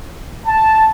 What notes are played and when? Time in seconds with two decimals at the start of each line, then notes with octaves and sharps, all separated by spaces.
0.47 A5